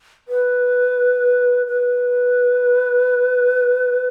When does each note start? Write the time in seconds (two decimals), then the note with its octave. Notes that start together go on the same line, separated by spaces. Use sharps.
0.28 B4
1.67 B4